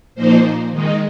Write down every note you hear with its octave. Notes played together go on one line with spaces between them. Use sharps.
A#2 F3 A#3 D#4 C5
D#3 G#3 D#4